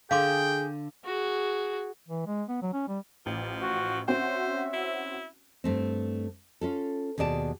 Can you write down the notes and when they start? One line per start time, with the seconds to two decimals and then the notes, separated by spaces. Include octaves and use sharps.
0.11 D3 G#4 F5 G5 C6 D6
1.05 F#4 G#4
2.08 E3
2.27 G#3
2.49 B3
2.62 F#3
2.74 C#4
2.88 G3
3.26 A1 F3
3.62 F#4
4.08 C4 C#4 F#4 C5 E5
4.73 E4
5.64 G2 A3 C4
6.61 C#4 F4 A4
7.18 D#2 B2 G#4 D5 A5